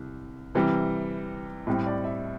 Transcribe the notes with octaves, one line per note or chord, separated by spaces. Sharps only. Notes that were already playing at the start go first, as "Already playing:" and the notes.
Already playing: C2
C3 E3 G3
A2 G3 C4
D5
E5